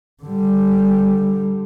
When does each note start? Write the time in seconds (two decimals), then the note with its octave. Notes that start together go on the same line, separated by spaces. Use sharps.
0.23 D3 G3